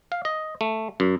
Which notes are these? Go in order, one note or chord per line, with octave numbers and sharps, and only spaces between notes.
F5
D#5
A3
F#2